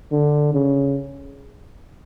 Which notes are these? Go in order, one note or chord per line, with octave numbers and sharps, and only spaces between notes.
D3
C#3